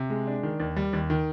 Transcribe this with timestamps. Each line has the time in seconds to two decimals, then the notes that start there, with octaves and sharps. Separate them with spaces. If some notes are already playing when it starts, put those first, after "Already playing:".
Already playing: C3
0.10 G#3
0.27 D4
0.43 D#3
0.60 D#2
0.76 G3
0.93 D#2
1.10 D#3